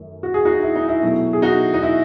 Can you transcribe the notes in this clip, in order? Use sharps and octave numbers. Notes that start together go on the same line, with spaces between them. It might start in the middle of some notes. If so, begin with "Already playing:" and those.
Already playing: F#2 D#3 A3
F#4
G#4
D#4 F#4
E4
D#4
E4
B2 F#3 A3
G#4
D#4 F#4
D#4
E4